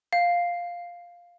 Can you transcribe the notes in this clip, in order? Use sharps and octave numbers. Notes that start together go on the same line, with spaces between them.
F5